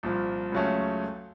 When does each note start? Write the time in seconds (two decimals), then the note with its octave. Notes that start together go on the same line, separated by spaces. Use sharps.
0.03 C2 A#2 F3
0.52 C#2 C#3 F#3 A3 C#4